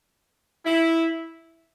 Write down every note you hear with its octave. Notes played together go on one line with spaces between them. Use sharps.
E4